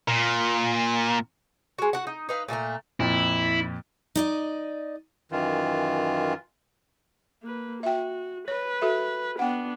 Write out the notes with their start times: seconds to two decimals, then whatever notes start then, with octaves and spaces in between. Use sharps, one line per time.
0.08 A#2
1.79 G#3 F#4
1.93 F#4 F#5
2.07 D#4
2.29 D#4 B4 F5
2.48 A#2 A3 A4 A#5
3.00 F2 A#2 E4
4.16 D#4 D5 D#5
5.32 F#2 D#3 E3 F4
7.43 A#3 B4
7.83 F#4 E5 G5
8.48 B4 C#5
8.82 F#4 A4 E5
9.39 B3 D4 F#5 G5